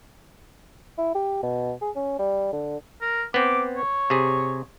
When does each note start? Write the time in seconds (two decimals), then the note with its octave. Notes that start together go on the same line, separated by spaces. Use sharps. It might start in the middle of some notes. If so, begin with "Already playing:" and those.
0.98 E4
1.15 G4
1.43 B2
1.82 G#4
1.96 C#4
2.19 G3
2.53 D3
3.01 A#4
3.34 B3 C4 D6
3.77 C#5
4.10 C3 G#4